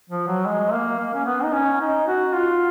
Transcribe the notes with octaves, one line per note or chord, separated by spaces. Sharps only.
F3
F#3
G#3
A#3
A#3
C#4
B3
D#4
C#4
D#4
F#4
F4